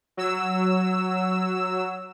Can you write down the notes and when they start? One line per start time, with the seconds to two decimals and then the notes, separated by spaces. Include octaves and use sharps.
0.17 F#3 E6